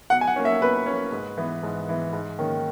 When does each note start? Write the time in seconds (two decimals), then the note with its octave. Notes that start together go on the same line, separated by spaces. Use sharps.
0.10 B2 F#5
0.21 G#5
0.27 F#5
0.36 A#3 C#4
0.45 E5
0.61 B2 B4
0.86 A#3 C#4
1.12 G#2
1.37 E3 B3
1.63 G#2
1.88 E3 B3
2.13 G#2
2.39 D#3 A#3 C#4